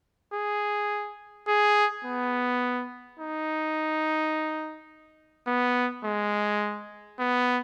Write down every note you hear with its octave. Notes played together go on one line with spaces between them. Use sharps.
G#4
G#4
B3
D#4
B3
G#3
B3